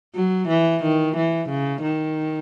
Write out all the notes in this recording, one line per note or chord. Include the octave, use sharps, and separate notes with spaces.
F#3
E3
D#3
E3
C#3
D#3